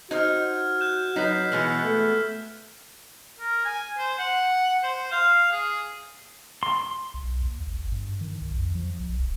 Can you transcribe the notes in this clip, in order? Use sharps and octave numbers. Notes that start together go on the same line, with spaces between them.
D#4 F#4 C5 F6 G#6
F#6 G6 E7
F#3 D#4 B4 F#6 B6 C7
B2 E3 G#3 B3 E6 F6
A3
A#4
G#5
C5
F#5
C5
F5
G#4
C6
B1
D#2
G#1
G2
D#3
B1
F2
F3
B1
D#1